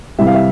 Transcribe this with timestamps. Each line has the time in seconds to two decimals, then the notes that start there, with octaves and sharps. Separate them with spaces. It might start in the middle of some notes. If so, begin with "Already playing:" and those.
0.18 C2 C3 E3 G3 E5
0.27 F5
0.34 E5